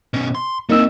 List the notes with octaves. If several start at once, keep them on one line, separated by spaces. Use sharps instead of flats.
B2 C#4
C6
G3 A#3 C4 D#4 E6